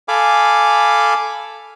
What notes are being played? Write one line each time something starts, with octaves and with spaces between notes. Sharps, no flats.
A4 F5 G#5 B5 D6